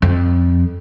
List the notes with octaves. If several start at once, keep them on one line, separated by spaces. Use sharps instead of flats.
F2